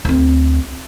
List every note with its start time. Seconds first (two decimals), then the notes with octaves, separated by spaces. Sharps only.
0.05 D2 C4